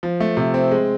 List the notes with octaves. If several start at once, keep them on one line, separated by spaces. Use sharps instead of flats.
F3
A3
C3
C4
G#3